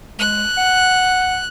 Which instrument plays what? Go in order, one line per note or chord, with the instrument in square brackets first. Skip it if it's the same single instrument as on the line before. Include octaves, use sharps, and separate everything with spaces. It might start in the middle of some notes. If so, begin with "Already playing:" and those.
[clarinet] G#3 [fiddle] F#6
[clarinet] F#5